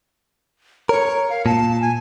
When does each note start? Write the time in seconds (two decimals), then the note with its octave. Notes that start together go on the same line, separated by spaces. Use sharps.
0.89 A#4 C#5
1.30 F5
1.46 A#2 A5
1.82 G#5